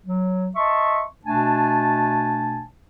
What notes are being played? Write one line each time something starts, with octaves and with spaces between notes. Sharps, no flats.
F#3
D#5 E5 A5 C6 C#6
B2 A3 D4 G#5 A5